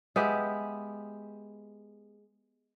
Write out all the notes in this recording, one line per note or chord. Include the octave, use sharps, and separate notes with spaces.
G#3 B3 G4 E5